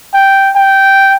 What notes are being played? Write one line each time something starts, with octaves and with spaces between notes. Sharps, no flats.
G5
G5